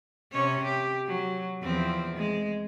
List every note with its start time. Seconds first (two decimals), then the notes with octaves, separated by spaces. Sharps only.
0.32 C3 C#4 C#5
0.64 G4
1.08 F#3
1.63 E2 F3 C4
2.17 G#3